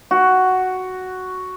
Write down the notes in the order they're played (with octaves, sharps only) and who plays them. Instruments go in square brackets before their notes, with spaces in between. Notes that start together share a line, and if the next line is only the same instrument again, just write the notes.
[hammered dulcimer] F#4